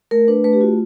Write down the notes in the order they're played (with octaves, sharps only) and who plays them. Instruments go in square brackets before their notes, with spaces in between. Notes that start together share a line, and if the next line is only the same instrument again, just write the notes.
[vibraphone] A3 A#4
D4 B4
A3 B4
G4
F4 F#4